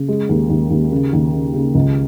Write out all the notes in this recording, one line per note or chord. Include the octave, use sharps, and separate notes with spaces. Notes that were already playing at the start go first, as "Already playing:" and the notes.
Already playing: C#3
G#3
D#2
D#2
D#2
C#3
D#2
C#3
C#3
C#2